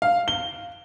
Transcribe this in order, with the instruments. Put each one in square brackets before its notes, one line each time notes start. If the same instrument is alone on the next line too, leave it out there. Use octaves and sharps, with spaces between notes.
[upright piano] F5
G7